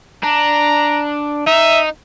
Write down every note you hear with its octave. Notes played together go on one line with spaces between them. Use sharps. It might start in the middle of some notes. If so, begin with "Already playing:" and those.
D4 A#5
D#4 E5